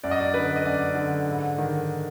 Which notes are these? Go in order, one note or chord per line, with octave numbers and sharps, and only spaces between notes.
F#2 D5
D#5
D5
D3 B4
D#5
F#2 D5
D3
G#2
D#3